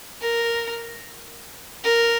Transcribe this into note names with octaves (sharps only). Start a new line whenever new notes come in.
A#4
A#4